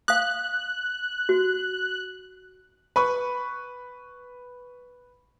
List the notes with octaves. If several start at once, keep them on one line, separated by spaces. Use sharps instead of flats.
F5 D#6 F#6
F#4
B4 B5 C#6